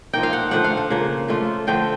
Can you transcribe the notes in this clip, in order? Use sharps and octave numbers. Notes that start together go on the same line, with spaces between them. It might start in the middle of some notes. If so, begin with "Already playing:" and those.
F3 A#3 D#4 G5
F5
F#5
D3 F3 A3 D4 F#5
F5
F#5
C#3 F3 A#3
F3 A3 D4 F4
D3 F3 A3 C4 G5